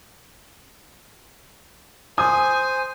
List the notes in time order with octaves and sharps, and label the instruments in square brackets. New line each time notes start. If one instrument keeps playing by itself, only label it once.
[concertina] C5 [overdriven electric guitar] G#5 [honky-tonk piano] D#6